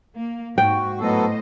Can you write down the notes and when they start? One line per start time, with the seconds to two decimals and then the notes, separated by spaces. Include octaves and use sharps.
0.15 A#3
0.58 G#2 F#4 G5
1.00 A2 F#3 B3 A4 C5 D#5